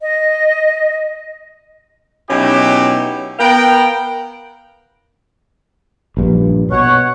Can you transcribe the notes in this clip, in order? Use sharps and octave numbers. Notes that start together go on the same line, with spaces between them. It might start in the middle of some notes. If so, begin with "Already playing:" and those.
D#5
B2 F#3 C#4 D#4 E4 G4
B3 A#4 F5 G5
A#1 G2
B2 C#5 F#5